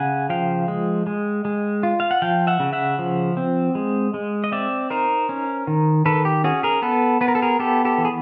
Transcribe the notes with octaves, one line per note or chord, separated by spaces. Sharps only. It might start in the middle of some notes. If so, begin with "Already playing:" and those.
Already playing: C#3 F#5 G#5
F3 F5 G5
G#3
G#3
G#3
F4
F5
F#5
F3 F5 G5
E5 F#5
C#3
E5 F#5
F3
C4
G#3
G#3
D#5
C4 D5 E5
D#4 A#4 C5
C#4
D#3
D#3 A4 B4
G4
C#4 F#4 G#4
G#4 A#4
B3 A4 B4
B3 B4
A#4
A4
G#4 A#4
B3 G4 A4
G4 A4
E3
G#4